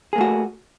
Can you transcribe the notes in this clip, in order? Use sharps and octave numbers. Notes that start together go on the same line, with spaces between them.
A3 A#3 F#4 G#4